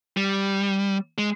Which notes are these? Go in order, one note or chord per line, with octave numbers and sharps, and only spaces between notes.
G3
G#3